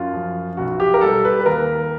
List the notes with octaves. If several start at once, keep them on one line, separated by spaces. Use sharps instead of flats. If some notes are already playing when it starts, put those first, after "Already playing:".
Already playing: F#2 F4
F3
B1 F#4
G4
A#4
G3 A4
B4
B4
D#2 A#4